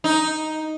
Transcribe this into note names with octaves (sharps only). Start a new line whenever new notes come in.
D#4